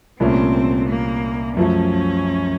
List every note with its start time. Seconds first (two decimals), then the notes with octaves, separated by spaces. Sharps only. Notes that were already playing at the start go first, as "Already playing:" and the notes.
0.20 C2 A#2 A3 C4 C#4
0.88 A#3
1.57 F#2 F3 A3 C#4